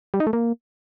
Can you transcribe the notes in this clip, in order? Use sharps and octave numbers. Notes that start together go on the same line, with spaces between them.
G3
D#4
A3
A#3